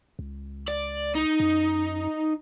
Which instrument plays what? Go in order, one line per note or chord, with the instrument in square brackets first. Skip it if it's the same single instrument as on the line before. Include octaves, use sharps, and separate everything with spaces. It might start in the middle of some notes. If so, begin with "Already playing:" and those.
[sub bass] C#2
[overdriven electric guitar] D5
D#4
[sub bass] F#2